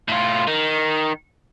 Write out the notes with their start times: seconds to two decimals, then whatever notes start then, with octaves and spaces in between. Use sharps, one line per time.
0.09 A2 F4
0.48 D#3